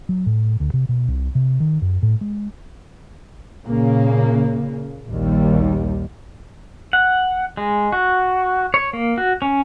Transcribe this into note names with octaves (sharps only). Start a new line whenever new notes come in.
F#3
A2
D2
C3
B2
C2
C3
D#3
F#2
A2
G#3
A#2 C#3 A#3
A#1 D#2 G3
F#5
G#3
F#4
C#5
A#3
F#4
C#4